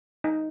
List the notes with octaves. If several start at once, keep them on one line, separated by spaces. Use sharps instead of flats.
D#4